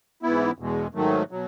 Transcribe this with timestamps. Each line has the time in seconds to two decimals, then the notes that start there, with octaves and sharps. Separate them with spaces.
0.22 G#2 E3 B3 E4
0.58 E2 B2 G#3
0.94 G#2 D#3 F#3 A3
1.31 B2 F#3